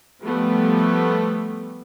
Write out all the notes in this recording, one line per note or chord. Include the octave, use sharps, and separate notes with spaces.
F3 G3 A3 B3